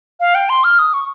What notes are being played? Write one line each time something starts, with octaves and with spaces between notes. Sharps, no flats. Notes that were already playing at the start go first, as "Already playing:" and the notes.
F5
G5
C6
F6
D#6
C#6